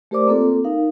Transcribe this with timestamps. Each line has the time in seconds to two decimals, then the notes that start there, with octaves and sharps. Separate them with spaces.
0.11 A3 G4 A#4 C5 D5 D6
0.27 A#3 C4 F4 A4
0.64 D#4 A#4 F5